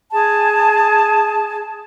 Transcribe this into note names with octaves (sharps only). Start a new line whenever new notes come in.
G#4 A5